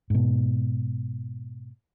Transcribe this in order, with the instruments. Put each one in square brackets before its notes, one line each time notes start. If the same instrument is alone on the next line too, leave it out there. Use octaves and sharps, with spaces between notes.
[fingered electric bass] G#2 B2